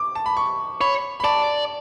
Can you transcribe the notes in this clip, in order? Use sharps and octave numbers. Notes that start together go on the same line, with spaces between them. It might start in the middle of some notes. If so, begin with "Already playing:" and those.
Already playing: D6
A5
B5
C#6
C#5 B5
B5
D5 A5